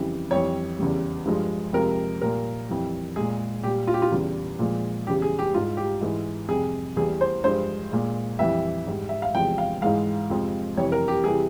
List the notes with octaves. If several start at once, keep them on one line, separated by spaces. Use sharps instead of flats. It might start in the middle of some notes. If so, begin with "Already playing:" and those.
Already playing: F2 C#3 E3 G3
F2 E3 G3 C#5
E2 C#3 G3
G2 F3 G#3
F2 C3 F3 G#3 A#4
A#2 G3 A#4
F2 E3 G3
A#2 G#3 G#4
A#2 G3 G4
F4
G4
F4
E2 C#3 G3
A#2 F3 G#3
E2 C#3 G3 G4
G#4
G4
G#2 G3 F4
G4
G#2 E3 G#3
F2 C3 G3 G#4
E2 E3 G3 G#4
C5
G2 F3 G#3 C5
A#2 G#3
F2 E3 G3 E5
G#2 G3
E5
F5
E2 C3 F3 G#3 G5
F5
G#2 E3 G#3 F5
F2 C3 F3 G#3
F2 C3 E3 G3 C#5
A#4
G4
C3 E3 G3 G#4